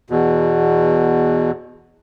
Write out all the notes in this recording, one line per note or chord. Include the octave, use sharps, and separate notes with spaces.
E2 B2